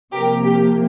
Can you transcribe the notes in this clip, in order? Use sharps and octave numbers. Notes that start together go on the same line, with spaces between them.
C3 F3 A#3 G4 A#4
G4